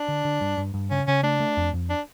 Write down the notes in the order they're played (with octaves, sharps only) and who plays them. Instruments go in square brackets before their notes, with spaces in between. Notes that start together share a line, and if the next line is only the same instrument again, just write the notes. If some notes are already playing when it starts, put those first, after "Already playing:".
Already playing: [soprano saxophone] D4
[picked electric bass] D3
D3
G2
G2
G2
[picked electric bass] C#3 [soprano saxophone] C#4
[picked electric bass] C#3 [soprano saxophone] C#4
[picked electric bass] A3 [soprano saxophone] D4
[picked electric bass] A3
F2
F2
[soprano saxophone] D4